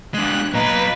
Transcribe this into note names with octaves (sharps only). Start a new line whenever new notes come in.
G#3 D4 F#6
A#2 F#3 A#3 B4 D#5